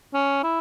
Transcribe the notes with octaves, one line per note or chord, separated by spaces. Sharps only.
C#4
E4